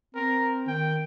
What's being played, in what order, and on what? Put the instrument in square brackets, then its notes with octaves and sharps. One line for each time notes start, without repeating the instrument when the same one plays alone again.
[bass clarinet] C4 [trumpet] A#4
[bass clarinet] D#3 [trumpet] G5